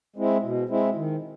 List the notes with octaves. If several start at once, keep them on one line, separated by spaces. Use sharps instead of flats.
G#3 C4 E4
B2
G#3 C4 E4
D#3